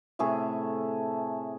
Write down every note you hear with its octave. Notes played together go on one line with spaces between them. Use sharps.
A2 C3 A3 G#4